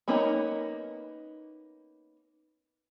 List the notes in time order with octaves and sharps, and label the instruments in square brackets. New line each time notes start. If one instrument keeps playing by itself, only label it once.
[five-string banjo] A#3 B3 C#4 D#4